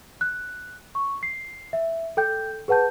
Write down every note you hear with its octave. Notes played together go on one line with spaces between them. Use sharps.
F#6
C#6
C7
E5
A4 G5 G6
G#4 B4 F#5 A5 G6